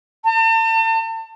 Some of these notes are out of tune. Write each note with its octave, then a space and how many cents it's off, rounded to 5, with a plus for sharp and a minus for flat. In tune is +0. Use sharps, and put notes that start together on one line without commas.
A5 +40